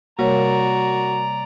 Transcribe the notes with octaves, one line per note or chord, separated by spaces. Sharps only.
C3 G3 A#3 F#4 C#5 D5 A#5